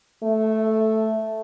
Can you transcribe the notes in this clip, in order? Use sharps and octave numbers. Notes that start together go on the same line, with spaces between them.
A3